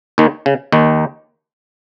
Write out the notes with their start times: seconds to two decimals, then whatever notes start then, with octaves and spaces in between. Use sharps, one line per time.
0.18 D#2 D#3
0.46 C#3
0.72 D#2 D#3